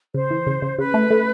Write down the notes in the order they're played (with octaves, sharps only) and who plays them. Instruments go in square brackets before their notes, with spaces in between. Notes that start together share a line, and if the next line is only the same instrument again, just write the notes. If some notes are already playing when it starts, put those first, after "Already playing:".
[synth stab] C#3 [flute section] C5
[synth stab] E3
C#3
C#3
[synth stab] C#3 [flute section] B4
[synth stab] A3
A3